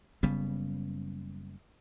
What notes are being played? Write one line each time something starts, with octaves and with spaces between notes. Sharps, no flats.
F#1 C#3 G3 B3